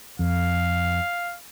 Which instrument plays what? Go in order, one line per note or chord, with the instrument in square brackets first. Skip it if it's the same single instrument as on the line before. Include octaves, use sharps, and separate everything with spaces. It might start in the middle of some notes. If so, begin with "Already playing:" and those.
[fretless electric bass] F2 [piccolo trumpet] F5